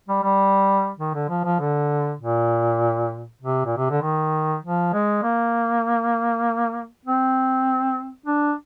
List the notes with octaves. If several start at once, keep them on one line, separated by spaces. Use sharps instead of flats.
G3
G3
D#3
D3
F3
F3
D3
A#2
C3
A#2
C3
D3
D#3
F3
G#3
A#3
C4
D4